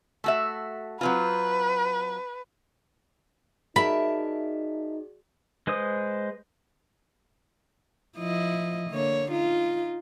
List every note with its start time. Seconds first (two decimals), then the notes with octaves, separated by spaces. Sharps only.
0.24 A3 F#4 E5
1.01 F#3 C4 F4 B4
3.76 D#4 F#4 G#4 A#4 D5 E5 A5 B5
5.67 G#3 B4 C5 D#6
8.17 F3 E4 D#5
8.90 D3 A#3 C#5
9.30 D#4 F4